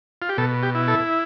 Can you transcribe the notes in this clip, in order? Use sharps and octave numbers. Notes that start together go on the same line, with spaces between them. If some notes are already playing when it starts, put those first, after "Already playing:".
F4
G4
B2 A4
G4
E4
A4